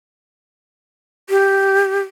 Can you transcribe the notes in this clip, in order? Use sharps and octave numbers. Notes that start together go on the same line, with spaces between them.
G4